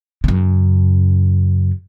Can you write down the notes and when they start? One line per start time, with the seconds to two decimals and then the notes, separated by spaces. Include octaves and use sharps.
0.24 F#2 C#3